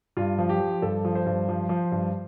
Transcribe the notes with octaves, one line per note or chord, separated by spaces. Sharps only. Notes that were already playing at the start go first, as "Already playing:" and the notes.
G2 F4
F3
G4
F3
G2 A4
F3
C5
G2
F3
F3
G2